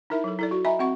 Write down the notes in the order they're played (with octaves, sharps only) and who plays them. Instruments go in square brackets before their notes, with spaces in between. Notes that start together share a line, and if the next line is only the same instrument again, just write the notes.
[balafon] D#4 E4 A#4 E5 B5
F#3 A4
E4 A4 D5
F#4
D#5 E5 G#5 A#5 B5
C4 F#4 F#5 C#6